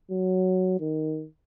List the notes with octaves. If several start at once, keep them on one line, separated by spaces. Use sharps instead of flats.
F#3
D#3